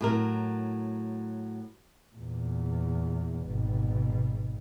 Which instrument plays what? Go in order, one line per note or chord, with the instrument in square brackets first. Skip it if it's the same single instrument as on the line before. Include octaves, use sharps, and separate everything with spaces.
[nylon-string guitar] A2 F#3 A#4
[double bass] E2 A#2
G#1 B2